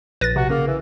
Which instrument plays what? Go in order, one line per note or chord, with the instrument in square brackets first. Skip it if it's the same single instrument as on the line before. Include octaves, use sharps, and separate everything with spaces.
[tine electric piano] A#1 A#6 [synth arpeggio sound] B4 A6
[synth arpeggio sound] C3 [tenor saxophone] F#4
[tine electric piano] C#3 [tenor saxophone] A#3
[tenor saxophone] E3